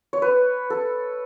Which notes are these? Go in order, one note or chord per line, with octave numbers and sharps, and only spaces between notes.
C#5
B4
A4